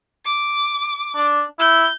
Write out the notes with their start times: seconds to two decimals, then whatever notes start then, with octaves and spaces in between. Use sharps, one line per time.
0.25 D6
1.16 D4
1.59 E4 G6